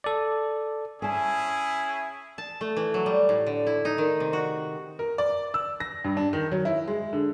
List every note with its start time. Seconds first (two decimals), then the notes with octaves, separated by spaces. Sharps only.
0.04 A4 D5
1.02 C#4 E4 G#4 G#5 A5
2.38 A5
2.61 A3
2.77 E3
2.94 F#3
3.06 G3
3.29 A2
3.47 D3
3.67 E4
3.85 D#4
3.98 D#3
4.20 C3
4.33 F#4
4.99 A#4
5.18 D5
5.54 E6
5.80 A#6
6.04 G2
6.17 D4
6.33 D#3
6.52 F#3
6.65 E4
6.88 G#3
7.13 D3